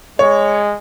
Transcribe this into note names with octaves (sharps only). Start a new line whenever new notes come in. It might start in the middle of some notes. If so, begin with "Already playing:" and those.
G#3 C#5